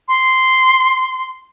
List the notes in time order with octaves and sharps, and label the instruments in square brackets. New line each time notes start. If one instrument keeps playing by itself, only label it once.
[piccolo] C6